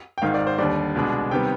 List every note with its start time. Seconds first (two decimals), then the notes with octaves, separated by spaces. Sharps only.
0.18 G5
0.22 G#1 G#2 D#3 F5
0.34 D5
0.47 C5
0.58 D#2 D3 G3 D5
0.95 C2 B2 G#3 D4
1.31 C3 D#3 G3 B3 G5